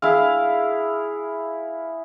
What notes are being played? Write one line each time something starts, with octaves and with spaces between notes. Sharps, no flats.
E4 G#4 F5